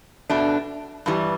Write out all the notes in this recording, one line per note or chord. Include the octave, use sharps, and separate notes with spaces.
B2 A3 D4
G2 E3 G3